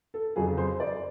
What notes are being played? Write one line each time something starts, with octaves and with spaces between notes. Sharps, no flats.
A4
F2 C#3 F#3 G#4
C5
D5